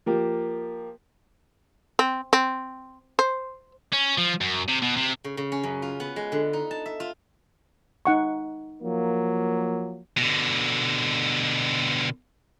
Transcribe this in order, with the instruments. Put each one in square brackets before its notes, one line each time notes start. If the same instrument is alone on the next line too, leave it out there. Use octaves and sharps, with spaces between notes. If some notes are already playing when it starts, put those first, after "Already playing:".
[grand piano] F3 A#3 G4
[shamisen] C4
C4
C5
[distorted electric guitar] C#4
F3
F#2
C3
B2
C3
[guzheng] C#3
C#3
C#4
F#2
F4
B3
G#3
D3
D#4
A5
E5
F4
[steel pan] D#4 F#5 C#6
[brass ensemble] F3 F#3 A#3
[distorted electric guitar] B2 D3